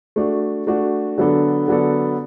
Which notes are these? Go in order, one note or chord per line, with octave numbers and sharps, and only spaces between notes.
A3 D4 F#4
A3 D4 F#4
D3 F#3 B3 D4 A4
D3 F#3 B3 D4 A4